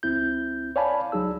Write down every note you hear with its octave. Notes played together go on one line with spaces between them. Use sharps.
C#2 C4 E4 G6
C#5 D5 F5 G#5 A5 B5
C#2 F#3 D#4 G#4 E6